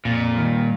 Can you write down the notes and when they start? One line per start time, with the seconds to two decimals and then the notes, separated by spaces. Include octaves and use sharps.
0.05 F2 A#2
0.36 D#3 G3